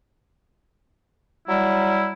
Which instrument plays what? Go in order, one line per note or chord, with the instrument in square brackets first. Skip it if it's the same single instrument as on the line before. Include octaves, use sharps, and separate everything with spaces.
[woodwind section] F#3 G3 E4